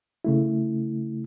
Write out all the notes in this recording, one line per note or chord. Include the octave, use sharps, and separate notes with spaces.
C#3 A3 E4